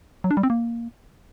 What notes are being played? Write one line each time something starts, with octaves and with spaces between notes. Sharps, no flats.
F#3
D4
G3
C4
A#3